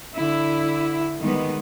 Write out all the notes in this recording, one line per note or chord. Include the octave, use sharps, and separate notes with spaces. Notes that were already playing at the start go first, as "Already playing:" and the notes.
D3 E4
D#3 G3 G#3 B3